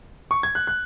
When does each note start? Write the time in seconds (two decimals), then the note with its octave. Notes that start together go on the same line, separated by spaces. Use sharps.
0.31 C#6
0.43 G#6
0.55 F#6
0.67 F#6